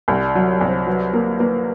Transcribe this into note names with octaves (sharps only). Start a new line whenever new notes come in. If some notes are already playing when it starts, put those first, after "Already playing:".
C2 D5
D5
F#3
C#5
C2
C5
F#3 B4
A#3 A#4
A#3 B4